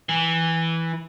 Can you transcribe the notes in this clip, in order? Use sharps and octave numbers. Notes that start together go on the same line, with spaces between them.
E3